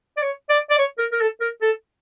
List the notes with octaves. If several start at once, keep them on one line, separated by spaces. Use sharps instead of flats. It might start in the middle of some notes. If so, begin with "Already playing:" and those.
D5
C#5
D5
D5
C#5
A#4
A#4
A4
A#4
A4